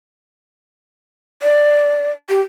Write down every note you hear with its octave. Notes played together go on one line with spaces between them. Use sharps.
D5
G4